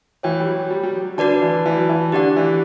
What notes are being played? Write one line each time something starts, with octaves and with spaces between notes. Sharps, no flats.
E3 F#4 C#5 G5
G3
F#3
G3
G3
F#3
D3 F#4 B4 D5 A5
E3
E3
F#3
E3
D3 G4 D5 F#5
E3